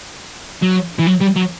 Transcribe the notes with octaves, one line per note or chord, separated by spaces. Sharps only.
F#3
E3
F#3
G3
F#3